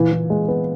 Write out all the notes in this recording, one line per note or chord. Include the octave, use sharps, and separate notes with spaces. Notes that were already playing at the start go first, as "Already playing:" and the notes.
Already playing: A#2 E3
E3
G#3
B3